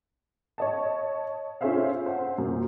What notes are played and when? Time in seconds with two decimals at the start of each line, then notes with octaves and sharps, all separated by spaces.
0.58 C#5 D#5 A5
1.61 C#4 F4 G#4 C5 E5 F5
2.06 C5 F#5
2.38 F#2 A#2